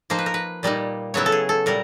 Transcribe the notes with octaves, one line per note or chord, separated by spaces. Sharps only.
F3 A#3 D#4 C5
B4
A#4
B4
A#2 G3 A#3 D#4
C#3 F#3 B3 E4 C#5
A4
G#4
A4
A#2 G3 A#4